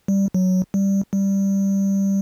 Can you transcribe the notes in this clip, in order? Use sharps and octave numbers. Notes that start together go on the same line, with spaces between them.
G3
F#3
G3
G3